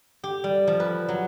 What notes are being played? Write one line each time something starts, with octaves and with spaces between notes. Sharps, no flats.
G4
G3
F3
B4
F#3